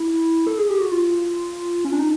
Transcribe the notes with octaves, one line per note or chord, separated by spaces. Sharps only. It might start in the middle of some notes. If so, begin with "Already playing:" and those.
Already playing: E4
A4
G#4
G4
F#4
F4
C#4
D4
D#4